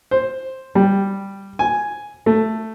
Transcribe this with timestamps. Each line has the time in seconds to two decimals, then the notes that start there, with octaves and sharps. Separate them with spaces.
0.11 C5
0.75 G3
1.59 G#5
2.26 A3